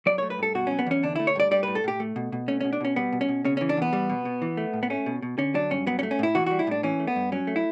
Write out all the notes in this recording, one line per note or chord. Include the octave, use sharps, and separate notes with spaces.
F#3 D5
A3 C#5
B4
G2 A4
B2 F#4
F#3 C#4
B3
E2 C#4
D3 D4
A3 E4
C#5
G2 D5
G3 D5
A2 B4
A4
A2 G4
A3
B2
B2
A3 C#4
B2 C#4
D4
B2 C#4
G3 B3
B2
C#4
B2
C#3 C#4
E3 C#4
D4
E2 B3
G3
B2
B2
E3
A3
A2
B3
A3 C#4
B2
B2
D3 C#4
F#3 D4
G2 C#4
F#3 B3
C#4
A3
C#4
A2 E4
E3 F#4
G3 F#4
E4
A2 D4
E3 C#4
A3
B3
G2
F#3 C#4
A3
E4